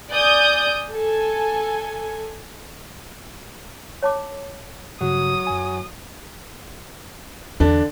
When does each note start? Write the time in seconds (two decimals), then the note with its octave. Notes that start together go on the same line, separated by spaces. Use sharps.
0.11 D5 G#5 D#6 G6
0.92 A4 G#5
4.03 C#5 A5 D6
5.01 G2 C#3 F#3 F#4 D#6
5.47 F#2 G#5
7.60 E2 D3 D4